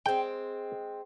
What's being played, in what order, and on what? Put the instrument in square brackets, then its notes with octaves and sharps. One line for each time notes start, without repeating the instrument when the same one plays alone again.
[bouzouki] G#3 C4 [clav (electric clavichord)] G5